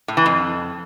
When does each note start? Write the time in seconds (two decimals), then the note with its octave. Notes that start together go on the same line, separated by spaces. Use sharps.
0.08 A2
0.17 E3
0.26 F2